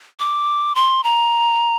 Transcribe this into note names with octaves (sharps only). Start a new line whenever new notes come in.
D6
C6
A#5